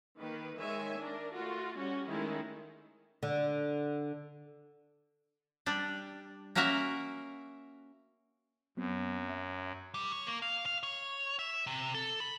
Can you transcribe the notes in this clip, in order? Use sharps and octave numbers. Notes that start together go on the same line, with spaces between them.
D#3 A#3 B4
D#3 G#3 C#5 E5 G#5
D4 A#4
A3 F4 F#4
G3 C#4 F#4
D#3 G#3 A3 C#4 D#4 E4
D3
G3 D4
A#3 C#4 F#4 A#4 E5 F#5
F#2 F#3 B3 C4
E5
G3
C#5
A#3
F5
F5
C#5
E5
C3
A4
B5